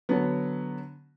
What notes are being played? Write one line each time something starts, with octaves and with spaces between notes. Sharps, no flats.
D3 F#3 B3